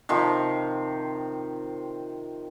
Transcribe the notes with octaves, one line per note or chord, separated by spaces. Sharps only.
C3 D#3 F3